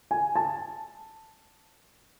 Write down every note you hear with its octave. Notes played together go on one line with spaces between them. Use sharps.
G#5
A5